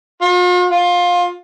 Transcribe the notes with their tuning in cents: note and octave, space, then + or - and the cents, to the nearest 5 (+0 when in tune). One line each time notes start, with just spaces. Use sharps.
F4 +45
F4 +20